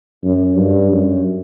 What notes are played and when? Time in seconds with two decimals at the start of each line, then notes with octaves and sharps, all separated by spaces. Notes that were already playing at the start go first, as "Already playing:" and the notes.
0.24 F#2
0.57 G2
0.92 F#2